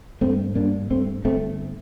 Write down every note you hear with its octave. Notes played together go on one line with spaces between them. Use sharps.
G2 A3 C4
G2 A#3 D4
G2 A3 C4
G1 A3 C4